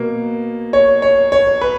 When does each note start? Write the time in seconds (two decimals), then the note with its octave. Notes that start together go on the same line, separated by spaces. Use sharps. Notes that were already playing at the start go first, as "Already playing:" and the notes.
Already playing: B2 A#3
0.73 C#5
1.02 C#5
1.32 C#5
1.61 B4